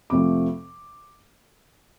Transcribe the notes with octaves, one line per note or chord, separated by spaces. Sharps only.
F2 C3 F3 A3 D6